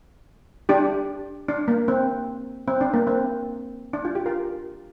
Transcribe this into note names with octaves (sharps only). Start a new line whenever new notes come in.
D4 G4
D4
A#3
C4
C4
D4
A#3
C4
D4
F4
G4
F4 A#4